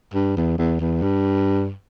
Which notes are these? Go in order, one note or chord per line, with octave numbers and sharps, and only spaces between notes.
G2
E2
E2
E2
G2